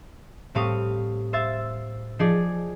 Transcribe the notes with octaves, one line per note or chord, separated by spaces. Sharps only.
A2 G3 C4 F5 C#6 D#6
C5 E5 F5 E6 A6
F3 D#4 G#4 D5